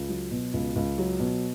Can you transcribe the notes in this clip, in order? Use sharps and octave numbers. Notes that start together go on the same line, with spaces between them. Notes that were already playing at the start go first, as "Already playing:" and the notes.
Already playing: C#2
F#3
B2
C#2
C#2
F#3
B2